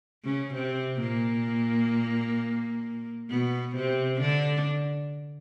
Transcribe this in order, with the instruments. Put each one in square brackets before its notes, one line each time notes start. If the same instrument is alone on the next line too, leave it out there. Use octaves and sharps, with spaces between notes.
[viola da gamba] C#3 C#4
C3 C4
A#2 A#3
B2 B3
C3 C4
D3 D4